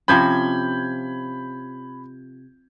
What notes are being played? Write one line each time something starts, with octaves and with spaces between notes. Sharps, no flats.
C3 F3 C#4 B5 G6 G#6